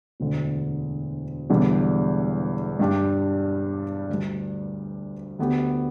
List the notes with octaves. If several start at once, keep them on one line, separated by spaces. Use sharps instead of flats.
E1 D2 D3
E1 E2 D3 G3 D4
G2 G3 D4 G4
D2 D3 G3
D2 D3 B3 G4